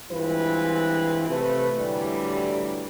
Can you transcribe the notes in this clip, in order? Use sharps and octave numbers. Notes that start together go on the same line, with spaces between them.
G2 E3 G#3 C4 F4 B4
C3 A3 B4
A2 D3 E3 F#3 G3